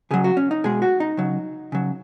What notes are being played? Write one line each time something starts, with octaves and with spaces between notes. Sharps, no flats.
C#3 F#3 G#4
F#4
C#4
D#4
B2 G#3 G#4
F#4
D#4
C#3 F#3
C#3 F#3